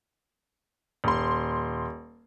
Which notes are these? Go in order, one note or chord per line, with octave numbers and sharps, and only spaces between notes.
D#1 C6